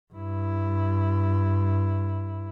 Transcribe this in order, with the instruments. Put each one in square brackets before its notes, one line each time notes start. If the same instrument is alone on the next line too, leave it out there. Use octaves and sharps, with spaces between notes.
[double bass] G2 E4